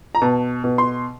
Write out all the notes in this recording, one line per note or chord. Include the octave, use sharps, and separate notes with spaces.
A#5
B2 A5
B2
C6